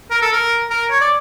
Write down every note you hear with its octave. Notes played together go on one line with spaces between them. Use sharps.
A#4
A4
A#4
A#4
C#5
D5